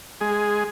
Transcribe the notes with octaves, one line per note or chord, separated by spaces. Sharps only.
G#3 G#4